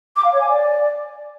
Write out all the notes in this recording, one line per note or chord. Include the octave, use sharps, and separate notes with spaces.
D6
F5
C#5
G#5
D5